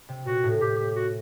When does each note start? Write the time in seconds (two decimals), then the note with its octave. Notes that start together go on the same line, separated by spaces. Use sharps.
0.09 C3
0.26 A#2 F#4
0.43 A2
0.61 A2 G4
0.78 G4
0.96 F#4